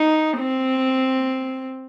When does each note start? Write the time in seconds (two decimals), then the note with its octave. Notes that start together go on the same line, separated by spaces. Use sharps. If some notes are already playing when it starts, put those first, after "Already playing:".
Already playing: D#4
0.38 C4